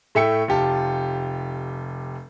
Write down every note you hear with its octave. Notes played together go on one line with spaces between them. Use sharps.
A2 A3 E5 G5 C#7
F1 F4 G4 A5